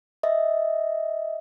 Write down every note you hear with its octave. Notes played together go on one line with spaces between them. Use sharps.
D#5 E5